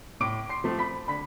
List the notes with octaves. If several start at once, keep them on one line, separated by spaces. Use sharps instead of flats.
A2 D6 D7
C6 C7
F3 A3 C4
B5 B6
D3 B5 B6